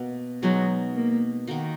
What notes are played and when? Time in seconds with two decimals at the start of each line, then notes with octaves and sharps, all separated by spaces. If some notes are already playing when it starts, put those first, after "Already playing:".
Already playing: B2 A#3
0.42 B2 F#3 G#3 B3 D#4
0.95 A#3
1.48 D#3 A#3 D#4 F#4